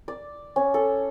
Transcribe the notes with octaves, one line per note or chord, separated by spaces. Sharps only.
D5
C#4
A4